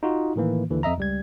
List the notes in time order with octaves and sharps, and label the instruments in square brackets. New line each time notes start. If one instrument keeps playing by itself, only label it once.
[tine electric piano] D#4 F4 F#4
A2 D#3 E3 A#3
D#2 D3 E3
F2 D#5 E5 A#5
C#2 G3 G#6